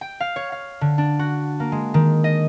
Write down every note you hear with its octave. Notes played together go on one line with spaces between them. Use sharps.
G5
F5
C#5
F5
D3
D4
F#4
A#3
G#3
D#3
D#5